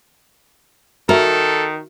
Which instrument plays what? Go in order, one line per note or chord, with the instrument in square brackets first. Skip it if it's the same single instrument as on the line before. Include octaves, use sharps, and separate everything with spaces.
[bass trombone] D#3 [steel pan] F#4 E5 [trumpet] A4 [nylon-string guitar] A#4